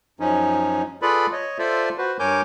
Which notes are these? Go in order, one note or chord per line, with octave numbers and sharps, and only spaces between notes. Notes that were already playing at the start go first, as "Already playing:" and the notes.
F#2 F3 C#4 D#4
F4 G#4 A4 B4 D5 B5
C#5 D#5
F4 A4 C5 D5 E5
F#4 B4 C5
G2 A#4 C#5 G#5 D6 G6